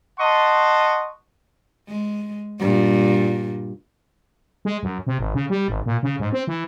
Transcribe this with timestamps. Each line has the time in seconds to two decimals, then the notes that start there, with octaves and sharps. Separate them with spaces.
0.19 D#5 F#5 A5 C6 C#6
1.88 G#3
2.59 G2 A#2
4.65 G#3
4.83 F#2
5.07 C3
5.19 G#1
5.34 C#3
5.50 G3
5.68 G#1
5.86 A#2
6.03 C#3
6.20 G#2
6.33 C4
6.47 E3